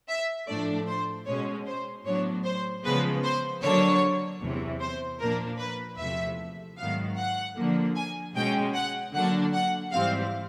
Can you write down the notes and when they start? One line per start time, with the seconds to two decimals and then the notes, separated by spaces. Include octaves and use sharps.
0.08 E5
0.47 A2 F3 A3 D4 D5
0.87 C5
1.26 B2 G#3 C#4 C#5
1.66 C5
2.05 A2 F#3 B3 D4 C#5
2.45 C5
2.84 C#3 F3 G#3 B3 B4
3.23 C5
3.63 D3 F#3 A#3 D4 C#5
4.41 E2 C3 E3
4.81 C5
5.20 A#2 F3 A#3 D4 A#4
5.59 B4
5.98 E2 C3 F3 A3 E5
6.77 G#2 D#3 F#3 B3 F5
7.18 F#5
7.56 D3 F3 A#3
7.96 G#5
8.35 B2 G#3 C#4 G5
8.74 F#5
9.13 D3 F#3 A#3 D4 F#5
9.53 F#5
9.92 G#2 E3 G3 C4 F5